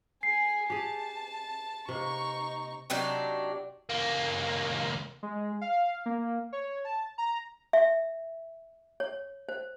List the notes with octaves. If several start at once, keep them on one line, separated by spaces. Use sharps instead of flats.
G#4 G#5 C7
G4 G#4 A5
C3 A#3 D#4 C#6
C3 F#3 D4 D#4
C#2 A#3
G#3
F5
A#3
C#5
A5
A#5
E5
C#5
C5